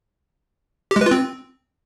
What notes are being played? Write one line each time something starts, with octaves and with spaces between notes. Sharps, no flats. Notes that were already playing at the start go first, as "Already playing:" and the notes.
G4
G#3
B4
F4
C4